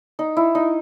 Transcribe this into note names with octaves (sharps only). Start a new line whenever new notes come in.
D#4
E4
D#4